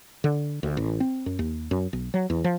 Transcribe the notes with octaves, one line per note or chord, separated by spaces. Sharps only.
D3
D2
A1
C4
F#2
D#2
F#2
B1
F#3
E2
F3